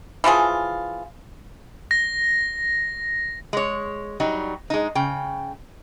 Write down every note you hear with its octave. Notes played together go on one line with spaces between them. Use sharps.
E3 F3 F4 G#4
A#6
G#3 C#5
F#3 G3 D#4
G#3 D#4
C#3 G5